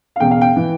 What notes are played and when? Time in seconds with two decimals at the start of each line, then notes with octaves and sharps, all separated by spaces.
0.16 F5
0.19 E1 E2 C#3 G5
0.31 F5
0.41 G5
0.56 E3